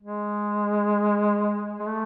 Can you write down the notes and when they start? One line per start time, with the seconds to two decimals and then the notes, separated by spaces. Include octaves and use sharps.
0.02 G#3
1.79 G#3
1.87 A3